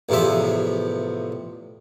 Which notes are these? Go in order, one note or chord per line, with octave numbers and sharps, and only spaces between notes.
A1 E2 C3 F3 E5